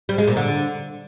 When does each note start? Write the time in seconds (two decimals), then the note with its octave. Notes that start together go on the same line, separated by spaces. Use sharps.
0.09 G3
0.18 G#3
0.27 A#2
0.37 D3